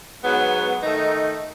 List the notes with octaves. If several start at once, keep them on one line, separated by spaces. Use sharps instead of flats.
G#2 F#3 B3
D#3 A3 D#4